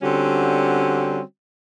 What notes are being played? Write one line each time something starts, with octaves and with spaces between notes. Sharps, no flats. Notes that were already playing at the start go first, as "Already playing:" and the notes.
D3 G3 C4 C#4 F#4